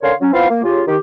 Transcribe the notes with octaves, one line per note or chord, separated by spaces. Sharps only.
D3 C#4 A#4 C#5 F5 C6
F#3 C#4
B3 C4 E4 F4 F5
A#3
C#3 F4 G4
D#3 G4